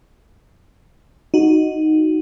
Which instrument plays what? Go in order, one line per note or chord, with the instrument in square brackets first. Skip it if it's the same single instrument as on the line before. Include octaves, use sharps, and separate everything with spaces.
[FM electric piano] D#4 F#4